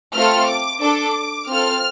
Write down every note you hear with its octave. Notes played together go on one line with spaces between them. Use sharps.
A3 C4 F4 A4 F6
D6
D4 A4 D6
C4 F4 A4 F6